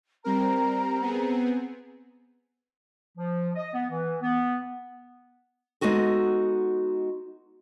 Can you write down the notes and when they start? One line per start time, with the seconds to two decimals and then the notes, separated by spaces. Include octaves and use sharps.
0.24 G3 C4 A#4 A#5
1.01 B3 C4 G#4
3.18 F3
3.56 D#5
3.74 B3
3.90 E3
4.22 B3
5.81 G#3 B3 D#4 F#4 A4